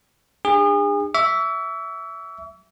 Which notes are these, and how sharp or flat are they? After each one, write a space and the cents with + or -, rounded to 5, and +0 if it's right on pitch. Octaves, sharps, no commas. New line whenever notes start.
D4 +35 G#4 -35
E5 +0 C#6 +45